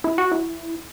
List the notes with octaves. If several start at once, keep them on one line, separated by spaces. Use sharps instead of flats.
E4
F#4
E4